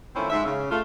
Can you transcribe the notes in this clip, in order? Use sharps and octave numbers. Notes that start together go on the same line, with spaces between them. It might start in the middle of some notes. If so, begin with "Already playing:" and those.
D#3 F3 A3 C4 C#4 E4
G#2 E5
C#3
A3 F4